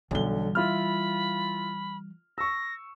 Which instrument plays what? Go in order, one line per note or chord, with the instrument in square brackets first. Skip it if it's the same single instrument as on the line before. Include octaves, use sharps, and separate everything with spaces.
[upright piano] B1 D3 G7 [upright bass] E3 G3
[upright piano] E4 F4 F6 [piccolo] B5
[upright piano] C#6 E6 [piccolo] A#6